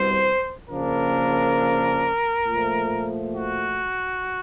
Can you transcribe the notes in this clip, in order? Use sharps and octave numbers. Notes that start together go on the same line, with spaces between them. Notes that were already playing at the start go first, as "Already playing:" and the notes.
Already playing: C2 B2 G3 C5
C#3 F3 A#3 D4 A#4
A#2 F3 A3
F#4